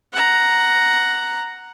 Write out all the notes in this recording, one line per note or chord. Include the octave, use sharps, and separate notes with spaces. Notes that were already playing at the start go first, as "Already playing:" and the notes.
F#5 A#5